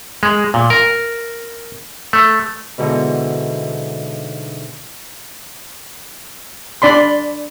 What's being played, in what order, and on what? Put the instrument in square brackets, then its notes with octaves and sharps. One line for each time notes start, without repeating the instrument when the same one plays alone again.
[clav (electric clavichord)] G#3
A#2
A#4
A3
[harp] G#2 B2 D3 E3
[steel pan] D4 D5 B5 C6